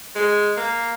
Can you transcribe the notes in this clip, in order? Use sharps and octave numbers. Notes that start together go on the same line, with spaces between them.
G#3
A#3